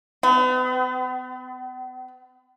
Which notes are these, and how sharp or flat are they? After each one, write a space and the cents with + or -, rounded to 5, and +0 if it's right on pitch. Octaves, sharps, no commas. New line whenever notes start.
B3 +45